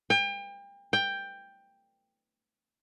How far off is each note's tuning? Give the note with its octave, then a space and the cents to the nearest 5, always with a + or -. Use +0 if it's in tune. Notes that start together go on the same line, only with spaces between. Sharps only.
G5 +35
G5 +10